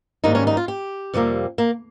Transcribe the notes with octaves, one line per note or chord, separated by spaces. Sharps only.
G#2 D#3 G3 A#3 D#4
C#4
D#4
F4
G4
F2 C3 G3 A#3
A#3